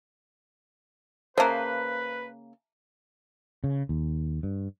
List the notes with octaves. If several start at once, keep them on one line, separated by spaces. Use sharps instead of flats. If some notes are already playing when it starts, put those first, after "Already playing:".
C#3 A#3 B4 C5 E5 A5 A#5
C#3
D#2
G2